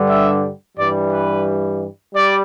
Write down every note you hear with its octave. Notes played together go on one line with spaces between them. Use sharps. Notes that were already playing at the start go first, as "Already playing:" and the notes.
Already playing: G2 D3 G3
E5
G2 E3 G3 D5
B4
G3 D5